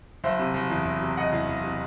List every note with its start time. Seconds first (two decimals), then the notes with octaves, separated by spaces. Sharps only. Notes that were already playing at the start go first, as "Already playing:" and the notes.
0.24 F#1 C5 E5
0.39 C3
0.54 F#1
0.70 E2
0.86 F#1
1.01 C3
1.17 F#1 D#5 F#5
1.32 E2
1.49 F#1
1.64 C3